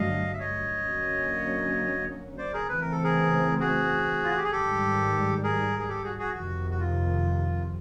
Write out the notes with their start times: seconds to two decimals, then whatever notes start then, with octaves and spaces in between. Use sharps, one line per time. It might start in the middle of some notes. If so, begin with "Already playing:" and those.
Already playing: G2 D3 F#3 A3 D#5 F5
0.34 E5
0.40 C#5 D#5
0.85 D3 F#3 A#3 C#4
2.38 C5 D5
2.53 G#4 A#4
2.68 C#3 E3 A3 C4 B4
2.81 A#4
2.92 A4
3.04 G#4 A#4
3.60 F#4 G#4
4.24 F4
4.30 F#4
4.37 G4
4.44 G#4
4.52 G#2 D#3 G3 G4 A4
5.43 G#4 A#4
5.79 G#4
5.89 G4 A4
6.04 F#4 G#4
6.19 F#4 G#4
6.34 F2 C3 D#3 F#4
6.71 F#4
6.80 F4